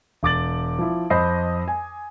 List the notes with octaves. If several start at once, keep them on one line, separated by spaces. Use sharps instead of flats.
E1 D6 A6 F#7
F3 E4
F2 C5 D#5 B5 D#6 C7
G#5